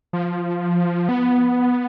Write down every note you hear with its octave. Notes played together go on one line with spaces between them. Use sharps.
F3
B3